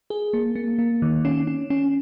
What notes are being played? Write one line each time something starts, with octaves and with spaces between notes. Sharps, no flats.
G#4
A#3
A#3
A#3
D#3
C#4
C#4
C#4